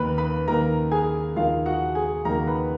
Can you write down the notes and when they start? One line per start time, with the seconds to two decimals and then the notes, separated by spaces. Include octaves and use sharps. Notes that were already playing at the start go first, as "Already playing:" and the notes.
Already playing: D#2 D#3 A#3 A#4 B4 B5
0.18 B4 B5
0.48 D#2 D#3 A#3 A#4 A#5
0.92 G#4 G#5
1.36 D#2 D#3 A#3 F4 F5
1.66 F#4 F#5
1.95 G#4 G#5
2.25 D#2 D#3 A#3 A#4 A#5
2.47 B4 B5